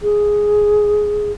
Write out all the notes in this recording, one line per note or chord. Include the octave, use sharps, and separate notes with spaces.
G#4